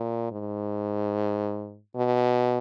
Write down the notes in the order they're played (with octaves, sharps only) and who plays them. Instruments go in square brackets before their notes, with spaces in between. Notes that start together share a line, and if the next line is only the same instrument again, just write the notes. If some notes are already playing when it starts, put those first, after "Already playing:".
Already playing: [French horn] A#2
G#2
B2